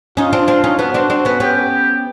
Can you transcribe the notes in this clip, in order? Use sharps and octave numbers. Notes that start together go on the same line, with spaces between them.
C#4 D#4 F4
C4 D4
C4 D4
C#4 D#4
B3 C#4 F#4
C4 D4
C4 D4
B3 C#4
B3 C#4 G4